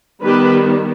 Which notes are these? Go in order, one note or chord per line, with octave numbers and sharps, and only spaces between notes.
D#3 G3 B3 G4 B4